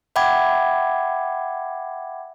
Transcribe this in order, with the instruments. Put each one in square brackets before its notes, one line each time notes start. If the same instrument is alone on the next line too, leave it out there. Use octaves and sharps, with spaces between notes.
[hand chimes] E5 F#5 G5 B5 D6 G#6